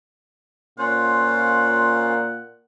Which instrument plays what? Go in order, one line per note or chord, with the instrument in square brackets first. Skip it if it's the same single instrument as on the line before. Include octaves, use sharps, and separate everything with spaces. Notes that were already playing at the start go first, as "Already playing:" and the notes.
[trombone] A#2 [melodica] C#4 F4 C5 [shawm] F#5